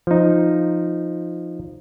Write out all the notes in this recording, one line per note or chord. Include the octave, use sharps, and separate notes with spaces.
F3 D#4